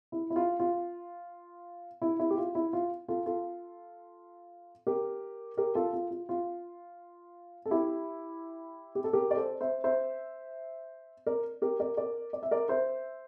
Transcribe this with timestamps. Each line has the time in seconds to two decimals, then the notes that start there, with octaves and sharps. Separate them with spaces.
0.12 E4
0.30 E4
0.36 F4
0.60 F4
2.02 E4
2.20 E4
2.30 G4
2.37 F4
2.55 E4
2.73 F4
3.08 F4 A4
3.26 F4 A4
4.87 G4 A#4
5.57 G4 A#4
5.75 F4 A4
5.93 F4
6.11 F4
6.29 F4
7.66 A4
7.71 E4 G4
8.95 G4
9.04 A4
9.13 G4 A#4
9.31 D5
9.37 A4 C5
9.61 C5 E5
9.84 C5 E5
11.26 A#4 D5
11.62 G4 A#4
11.80 A#4 D5
11.97 A#4 D5
12.33 D5
12.43 E5
12.51 A#4 D5
12.69 C5 E5